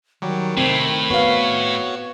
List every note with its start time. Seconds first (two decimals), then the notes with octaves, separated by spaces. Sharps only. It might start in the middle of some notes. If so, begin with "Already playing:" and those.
0.22 D#3 F#3 G3
0.57 A2 C3 C4
1.10 B3 F#4 C#5 F5